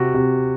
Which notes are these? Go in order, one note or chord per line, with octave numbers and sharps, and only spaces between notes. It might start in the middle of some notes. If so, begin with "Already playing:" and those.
Already playing: C3 F#4
C3